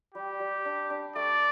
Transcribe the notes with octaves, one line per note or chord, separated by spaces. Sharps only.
G3 G4
G3
D4
D4
A3 D5